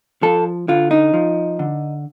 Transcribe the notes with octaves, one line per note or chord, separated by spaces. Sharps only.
F3 A4
D3 F4
D#4
F3
D3